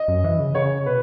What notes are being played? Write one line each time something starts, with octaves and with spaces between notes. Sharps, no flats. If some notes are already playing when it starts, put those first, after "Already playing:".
Already playing: D#5
F#2
E3
C#3
C#3 C#5
B2 B4